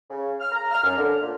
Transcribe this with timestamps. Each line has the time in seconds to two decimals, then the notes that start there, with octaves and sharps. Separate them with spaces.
0.10 C#3
0.40 F6
0.52 A#5
0.72 F6
0.84 F#2
0.97 D3
1.22 A#2